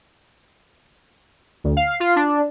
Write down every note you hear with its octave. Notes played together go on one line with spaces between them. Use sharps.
D2
F5
F4
D4